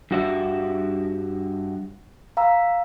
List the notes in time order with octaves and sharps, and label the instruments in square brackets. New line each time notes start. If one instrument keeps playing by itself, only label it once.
[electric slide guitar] G2 F#4 E5
[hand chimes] F5 A#5 E6